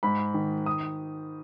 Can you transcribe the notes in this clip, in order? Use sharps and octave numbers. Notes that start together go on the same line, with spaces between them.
G#2 B5
D#3
D#6